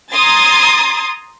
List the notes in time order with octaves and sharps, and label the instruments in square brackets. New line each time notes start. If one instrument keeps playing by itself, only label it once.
[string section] A#5 C6 D#6 G#6 A6